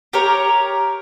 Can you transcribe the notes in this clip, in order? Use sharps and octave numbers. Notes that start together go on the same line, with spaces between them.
G4 A#4 C#5